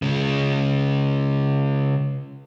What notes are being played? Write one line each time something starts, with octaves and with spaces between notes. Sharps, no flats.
C#3 G#3